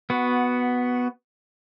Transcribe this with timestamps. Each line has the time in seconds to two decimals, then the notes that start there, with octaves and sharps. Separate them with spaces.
0.10 B3 F#4